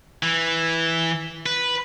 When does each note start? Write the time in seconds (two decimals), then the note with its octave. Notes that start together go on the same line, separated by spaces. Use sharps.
0.23 E3
1.46 B4